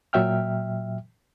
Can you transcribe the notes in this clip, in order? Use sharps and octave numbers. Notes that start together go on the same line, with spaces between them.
A#2 F#3 E5 G5 F6